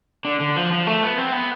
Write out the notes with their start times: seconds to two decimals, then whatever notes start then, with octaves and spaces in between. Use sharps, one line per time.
0.25 D3
0.40 D3
0.56 F3
0.72 F3
0.87 A3
1.03 B3
1.18 C4
1.33 B3